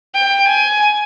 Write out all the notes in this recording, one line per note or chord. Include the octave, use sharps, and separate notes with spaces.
G5
G#5